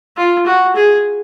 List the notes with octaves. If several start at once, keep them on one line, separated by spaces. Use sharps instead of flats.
F4
F#4
G#4